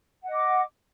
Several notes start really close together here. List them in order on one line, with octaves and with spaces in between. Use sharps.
F#5 D#5 D6